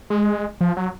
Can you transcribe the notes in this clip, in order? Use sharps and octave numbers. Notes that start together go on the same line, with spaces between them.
G#3
F3
F#3